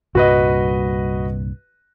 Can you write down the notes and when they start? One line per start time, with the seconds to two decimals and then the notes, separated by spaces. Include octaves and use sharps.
0.15 C2 G2 A#2 F#4 B4 D#5